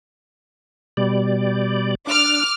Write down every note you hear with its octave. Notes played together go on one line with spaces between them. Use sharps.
B2 G3 D5
D4 D6 F6